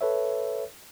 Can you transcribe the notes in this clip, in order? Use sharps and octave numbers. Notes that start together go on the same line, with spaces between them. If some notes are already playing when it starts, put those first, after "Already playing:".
A4 B4 C#5 E5